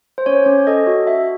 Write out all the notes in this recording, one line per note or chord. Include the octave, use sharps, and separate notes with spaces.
C5
C#4 C#5
C#4
A4 D#5
F#4
F#4 E5